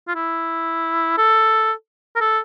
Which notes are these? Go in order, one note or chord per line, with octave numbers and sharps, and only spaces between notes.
F4
E4
A4
A#4
A4